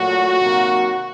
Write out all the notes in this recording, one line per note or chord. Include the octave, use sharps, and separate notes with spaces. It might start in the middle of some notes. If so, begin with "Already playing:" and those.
Already playing: A#2 F#3 A3 F#4
C3 D#3 F#3 A#3